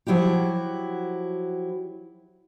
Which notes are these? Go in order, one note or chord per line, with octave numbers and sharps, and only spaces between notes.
F3 F#3 E4 F#4 G4